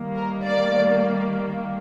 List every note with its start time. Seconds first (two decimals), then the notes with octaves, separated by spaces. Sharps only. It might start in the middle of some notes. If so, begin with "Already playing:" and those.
Already playing: D#3 G3 A#3
0.16 A#4
0.45 D5